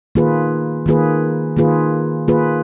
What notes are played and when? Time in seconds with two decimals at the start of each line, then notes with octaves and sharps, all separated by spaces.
0.15 D#3 A#3 F4 G#4 B4
0.86 D#3 A#3 F4 G#4 B4
1.57 D#3 A#3 F4 G#4 B4
2.28 D#3 A#3 F4 G#4 B4